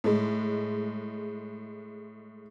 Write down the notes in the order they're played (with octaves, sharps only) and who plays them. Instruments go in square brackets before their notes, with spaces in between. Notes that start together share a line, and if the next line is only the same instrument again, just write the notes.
[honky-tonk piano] A2 G#3